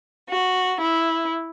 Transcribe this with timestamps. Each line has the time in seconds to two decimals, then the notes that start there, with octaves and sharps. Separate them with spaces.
0.28 F#4
0.81 E4